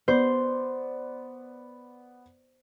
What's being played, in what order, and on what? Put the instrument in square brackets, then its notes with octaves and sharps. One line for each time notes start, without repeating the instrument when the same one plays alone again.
[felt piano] B3 D5 [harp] C5